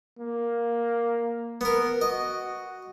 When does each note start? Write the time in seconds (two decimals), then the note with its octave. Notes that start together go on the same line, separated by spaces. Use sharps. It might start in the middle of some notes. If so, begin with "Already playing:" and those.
0.19 A#3
1.61 B3 A#4
2.01 F#4 D#5